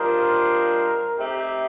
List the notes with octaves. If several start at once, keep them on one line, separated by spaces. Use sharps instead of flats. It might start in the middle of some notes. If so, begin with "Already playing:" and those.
Already playing: G3 D4 F4 A#4 C5 D#5
A3 C4 D#4 G4